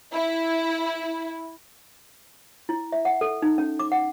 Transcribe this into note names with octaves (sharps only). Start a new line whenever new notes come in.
E4
E4
E5
F#5
A4
D#4
C#4
D6
F#5